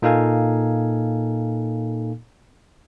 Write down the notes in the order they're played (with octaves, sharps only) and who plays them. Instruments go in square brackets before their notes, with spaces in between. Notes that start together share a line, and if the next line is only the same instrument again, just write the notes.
[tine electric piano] A#2 A#3 D#4 A4 F5 G#5